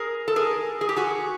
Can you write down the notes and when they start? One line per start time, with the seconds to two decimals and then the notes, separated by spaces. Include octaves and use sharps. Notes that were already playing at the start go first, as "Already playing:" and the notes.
Already playing: G#4 A#4
0.28 A4
0.36 G#4 A#4
0.81 G#4
0.89 G4
0.96 F#4 G#4